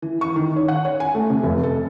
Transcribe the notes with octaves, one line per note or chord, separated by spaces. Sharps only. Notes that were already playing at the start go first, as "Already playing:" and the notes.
E3
C#6
D#3
C#5
F#5
C#5
G#5
A3
C3
F1
A4